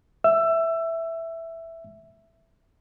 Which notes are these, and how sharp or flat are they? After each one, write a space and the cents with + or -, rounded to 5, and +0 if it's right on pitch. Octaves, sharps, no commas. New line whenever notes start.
E5 +0 E6 +20